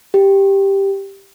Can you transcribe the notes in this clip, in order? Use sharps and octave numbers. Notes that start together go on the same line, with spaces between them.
G4